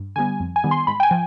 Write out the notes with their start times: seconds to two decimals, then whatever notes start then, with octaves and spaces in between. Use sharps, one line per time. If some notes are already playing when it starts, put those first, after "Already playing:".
Already playing: G2
0.16 D3 G3 B3 G#5
0.40 F2
0.56 G#5
0.64 D#3 G3 B3
0.71 C6
0.87 G#2 B5
1.00 G5
1.03 G#5
1.11 F3